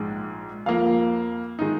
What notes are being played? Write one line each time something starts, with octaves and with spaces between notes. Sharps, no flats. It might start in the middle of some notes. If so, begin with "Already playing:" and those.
Already playing: A#1 G#2 G#3
F2 F3 A#3 F5
D#3 G#3 D#4